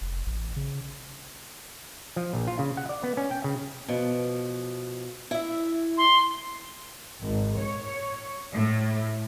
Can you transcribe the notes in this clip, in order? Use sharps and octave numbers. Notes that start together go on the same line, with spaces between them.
F1
A1
C#3
F3
A#1
F4
C#3
F#5
D5
B3
C#4
G5
C#3
B2 F3
E4 E5
C6
G#1
C#5
A2